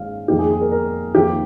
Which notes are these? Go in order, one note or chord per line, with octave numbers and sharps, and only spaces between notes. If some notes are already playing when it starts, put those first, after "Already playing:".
Already playing: G#2 D#3 G#3 C#4 F5
F2 D#3 A#3 D#4 G4
G#4
G#4
A#4
A#4
F2 D#3 A#3 G4